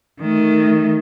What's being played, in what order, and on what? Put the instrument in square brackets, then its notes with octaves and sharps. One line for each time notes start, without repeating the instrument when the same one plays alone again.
[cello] D#3 A3